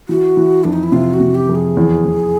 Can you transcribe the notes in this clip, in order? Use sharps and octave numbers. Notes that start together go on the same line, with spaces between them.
E3 F#4
E3
F2 D4
D#4
E4
C3 F4
F#4
C3
G4
F2
G#4
E2
E2